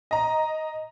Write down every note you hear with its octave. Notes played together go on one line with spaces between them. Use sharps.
D#5 A#5